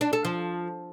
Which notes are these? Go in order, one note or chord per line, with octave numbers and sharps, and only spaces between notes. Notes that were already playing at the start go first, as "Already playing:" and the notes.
D4
A4
F3